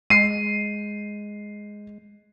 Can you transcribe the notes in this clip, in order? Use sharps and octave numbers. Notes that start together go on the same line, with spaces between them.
G#3 C7 D#7